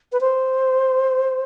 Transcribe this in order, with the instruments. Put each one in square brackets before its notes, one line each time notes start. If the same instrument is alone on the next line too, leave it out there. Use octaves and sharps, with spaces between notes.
[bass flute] B4
C5